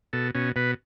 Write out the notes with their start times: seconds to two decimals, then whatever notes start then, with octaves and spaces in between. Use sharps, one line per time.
0.13 B2 A4
0.35 B2 C#4
0.56 B2 B4